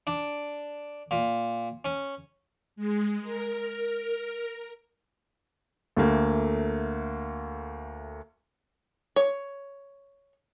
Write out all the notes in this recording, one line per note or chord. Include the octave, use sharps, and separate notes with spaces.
D4
A#2
C#4
G#3
A#4
D2 A3 A#3
C#5